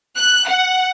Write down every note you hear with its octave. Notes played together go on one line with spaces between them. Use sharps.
F#6
F#5